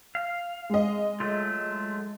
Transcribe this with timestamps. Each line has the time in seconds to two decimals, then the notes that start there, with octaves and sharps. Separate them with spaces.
0.15 F5
0.70 G#3 D#5
1.20 F#3 A3 F4